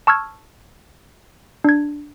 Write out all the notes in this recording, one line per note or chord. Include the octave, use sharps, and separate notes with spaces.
A5 C#6 E6 F6 G#6
D4 G#6